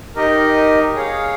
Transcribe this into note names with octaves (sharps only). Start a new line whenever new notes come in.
D#4 G4 A#4 D#5
G#4 C#5 F5